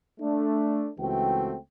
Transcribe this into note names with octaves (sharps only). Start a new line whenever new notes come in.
A3 D4
C#2 E3 A3 C4 F#4 G5